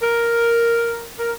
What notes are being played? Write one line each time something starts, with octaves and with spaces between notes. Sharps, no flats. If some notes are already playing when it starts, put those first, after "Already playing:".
A#4
A#4